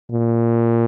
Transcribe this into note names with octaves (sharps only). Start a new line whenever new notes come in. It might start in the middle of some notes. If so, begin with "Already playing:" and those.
A#2